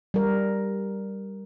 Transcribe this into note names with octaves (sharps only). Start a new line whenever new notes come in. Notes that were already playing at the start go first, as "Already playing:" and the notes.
G3 A#4